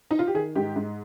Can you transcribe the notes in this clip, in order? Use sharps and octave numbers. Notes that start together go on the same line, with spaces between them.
D#4
F4
G4
D#3 G#4
G#2 G4
G#2